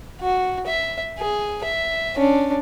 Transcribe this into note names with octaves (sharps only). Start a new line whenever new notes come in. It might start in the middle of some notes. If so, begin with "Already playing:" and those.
F#4
E5
G#4
E5
C#4 D4